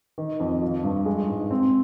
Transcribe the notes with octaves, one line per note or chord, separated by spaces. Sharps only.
D#3
F2
F3
G2
G#3
G#2
C4